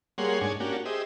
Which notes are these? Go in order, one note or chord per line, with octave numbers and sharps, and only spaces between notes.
G3 A#3 G#4 C#5 F#5 C6
G#2 D4 C#5 G#5
A#3 C#4 D4 F#4 G4
G4 G#4 C5 D#5 E5